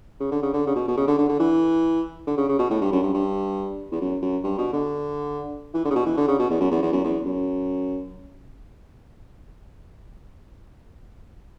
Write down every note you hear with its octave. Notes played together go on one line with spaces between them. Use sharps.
C#3
D3
C#3
D3
C#3
B2
B2
C#3
D3
D3
D3
E3
D3
C#3
C#3
B2
A2
G2
F#2
G2
G2
E2
F#2
F#2
G2
B2
D3
E3
D3
C#3
B2
E3
D3
C#3
B2
E2
F#2
E2
E2
F#2
E2
F#2